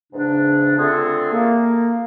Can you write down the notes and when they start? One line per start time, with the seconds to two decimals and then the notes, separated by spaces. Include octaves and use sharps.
0.13 E2 G#2 C#3 D4
0.78 D3 A3 C4 F4 G#4 A4
1.32 A#3